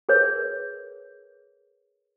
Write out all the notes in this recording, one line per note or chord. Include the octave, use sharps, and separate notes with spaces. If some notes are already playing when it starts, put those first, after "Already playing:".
G#4 A#4 B4 C#5